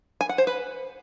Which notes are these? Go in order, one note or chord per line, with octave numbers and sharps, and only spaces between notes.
G#5
F#5
C5
B4